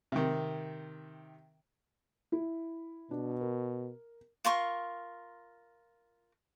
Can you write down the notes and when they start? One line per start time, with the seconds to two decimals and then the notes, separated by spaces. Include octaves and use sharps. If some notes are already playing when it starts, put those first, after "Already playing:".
0.12 C3 D#3
2.32 E4
3.11 B2 D4
3.41 A#4
4.45 F4 A#4 C6 C#6